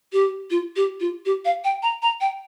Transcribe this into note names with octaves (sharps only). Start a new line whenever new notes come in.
G4
F4
G4
F4
G4
F5
G5
A#5
A#5
G5